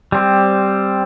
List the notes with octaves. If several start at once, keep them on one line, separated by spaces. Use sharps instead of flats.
G3 C4